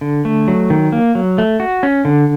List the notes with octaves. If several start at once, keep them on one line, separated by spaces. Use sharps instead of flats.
D3
A3
F#3
D#3
A#3
F#3
A3
F#4
C#4
D3